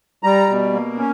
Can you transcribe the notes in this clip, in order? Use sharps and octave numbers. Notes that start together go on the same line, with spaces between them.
G3 A#5
B2
A#3
C#4